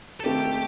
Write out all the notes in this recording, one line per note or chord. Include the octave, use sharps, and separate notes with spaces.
A4
D#2 D#3 A3 C4 G4